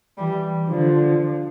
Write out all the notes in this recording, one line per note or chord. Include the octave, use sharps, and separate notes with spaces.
E3 G3
D3 F3